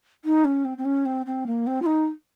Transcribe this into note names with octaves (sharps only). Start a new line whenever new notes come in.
D#4
C#4
C4
C4
C#4
C4
C4
A#3
C4
F4
D#4